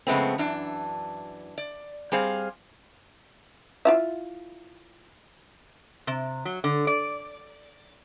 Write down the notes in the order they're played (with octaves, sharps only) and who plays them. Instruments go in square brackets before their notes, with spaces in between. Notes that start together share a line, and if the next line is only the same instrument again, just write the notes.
[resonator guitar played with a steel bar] F2 C#3 G#3 A3 B3 C4
F#2 E3 D4
D5
G3 C4 G#4 C5 F5
[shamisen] E4 F4 E5
[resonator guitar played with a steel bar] C3
F#3
D3
D5